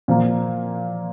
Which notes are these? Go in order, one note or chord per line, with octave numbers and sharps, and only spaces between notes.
A#2 F3 A#3